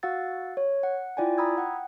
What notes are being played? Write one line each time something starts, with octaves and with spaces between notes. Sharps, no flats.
F#4 F5 F#5 E6 A6
C#5
F#5
E4 F4 D5 G5 G#5
A#5 B5 D#6 E6 G#6
F#5 G5